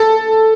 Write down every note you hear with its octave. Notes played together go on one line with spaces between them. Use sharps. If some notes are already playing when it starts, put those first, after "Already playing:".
Already playing: A4